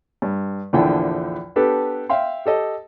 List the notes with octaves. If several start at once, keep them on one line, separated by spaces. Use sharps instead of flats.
G2
A#1 E2 D3 F3 E4 G5
B3 D4 G4 A4 B4
E5 F5 G5 C6
G4 A4 D#5